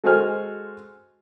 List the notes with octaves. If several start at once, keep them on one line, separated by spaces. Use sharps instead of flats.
G#3 F#4 A4 C5 G#5 F6